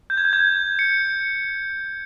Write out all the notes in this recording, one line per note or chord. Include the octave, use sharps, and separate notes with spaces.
G6
G#6
G6
G#6
C#7